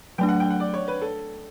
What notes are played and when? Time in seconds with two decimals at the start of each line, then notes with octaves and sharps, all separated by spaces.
0.18 F#3 A3 D4 G5
0.29 F#5
0.40 G5
0.50 F#5
0.60 D5
0.74 C#5
0.88 B4
1.02 A4